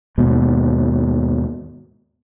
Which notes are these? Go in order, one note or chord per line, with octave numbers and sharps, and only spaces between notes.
D#2 G#2 B2